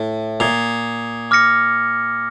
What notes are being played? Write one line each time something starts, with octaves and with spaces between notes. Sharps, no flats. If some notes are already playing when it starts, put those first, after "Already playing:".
Already playing: A2
A#2 D#6 G#6 C7 F7
D6 F6 A#6 C#7